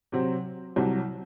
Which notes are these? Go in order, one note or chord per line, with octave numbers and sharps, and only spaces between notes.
C3 F#3 C4
C2 C3 F#3